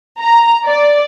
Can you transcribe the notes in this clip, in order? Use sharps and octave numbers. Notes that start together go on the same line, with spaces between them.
A#5
D5